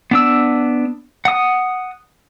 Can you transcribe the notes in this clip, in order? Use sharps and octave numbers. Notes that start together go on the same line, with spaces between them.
B3 D4 E6
F#5 D#6